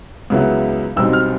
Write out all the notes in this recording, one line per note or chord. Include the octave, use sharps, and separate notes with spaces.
C#2 C#3 F#3 B3 E4
B1 B2 G3 C4 D#4 E6
F6